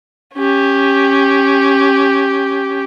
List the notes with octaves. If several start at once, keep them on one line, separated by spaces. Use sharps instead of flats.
C#4 G4